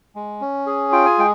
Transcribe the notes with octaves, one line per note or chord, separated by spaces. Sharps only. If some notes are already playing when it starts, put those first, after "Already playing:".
G#3
C#4
G#4
F4 G5
G#5
G#3 G5